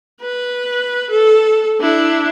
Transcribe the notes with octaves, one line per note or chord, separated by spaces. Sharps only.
B4
A4
D4 E4